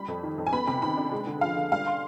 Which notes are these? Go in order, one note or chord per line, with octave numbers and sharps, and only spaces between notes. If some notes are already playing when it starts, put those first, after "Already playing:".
Already playing: G3 B5
F2
D#3
F2
G#5
B3 B5
C3 B5
D#3 B5
D4
G#3
D3
F3 F5
D3
G3 F5
C6